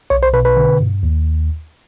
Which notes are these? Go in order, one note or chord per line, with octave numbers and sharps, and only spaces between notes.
B1 C#5
C5
B2 B4
B4
D3
G2
D#2